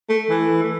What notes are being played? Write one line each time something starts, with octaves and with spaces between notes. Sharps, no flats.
A3
E3
A3